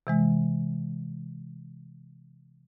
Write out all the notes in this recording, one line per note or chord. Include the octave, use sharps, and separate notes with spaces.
C3 E3 G#3